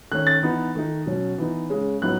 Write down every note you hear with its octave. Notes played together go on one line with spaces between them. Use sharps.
D#3 A3 C#4 F#6
A6
E3 B3 D#4
D#3 A3 D#4
B2 F#3 C#4
E3 B3 D#4
C#3 G#3 C#4
A2 F#3 B3 D#4 F#6